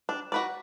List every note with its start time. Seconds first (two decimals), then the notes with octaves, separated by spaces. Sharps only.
0.09 D4
0.32 F#4 B4 D5